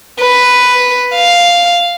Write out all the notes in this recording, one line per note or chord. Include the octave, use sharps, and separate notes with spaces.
B4
F5